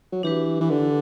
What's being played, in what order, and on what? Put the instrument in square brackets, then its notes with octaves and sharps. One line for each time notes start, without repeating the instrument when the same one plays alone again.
[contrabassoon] F#3
[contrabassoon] E3 [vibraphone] D4 G4 B4
[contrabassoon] E3
D3